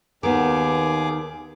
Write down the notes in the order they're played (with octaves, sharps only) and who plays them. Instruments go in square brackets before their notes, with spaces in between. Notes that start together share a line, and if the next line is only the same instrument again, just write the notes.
[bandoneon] D#2 G#4 D6 [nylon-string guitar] D#3 B3